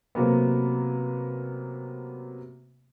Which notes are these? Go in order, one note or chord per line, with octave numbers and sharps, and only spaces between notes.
C3 F#3 A#3 B3